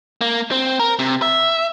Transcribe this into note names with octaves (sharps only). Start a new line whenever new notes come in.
A#3
C4
A#4
C3
E5